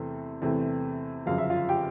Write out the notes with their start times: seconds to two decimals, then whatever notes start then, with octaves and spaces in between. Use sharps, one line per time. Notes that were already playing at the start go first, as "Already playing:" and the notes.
Already playing: E2 C3 E3 A3 C4
0.42 E2 C3 E3 A3 C4
1.26 G1 F#2 C#3 F3 F5
1.38 E5
1.50 F4 F5
1.69 G4 G5